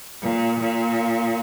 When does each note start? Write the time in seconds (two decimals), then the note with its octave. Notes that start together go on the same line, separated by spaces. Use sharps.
0.22 A#2
0.59 A#2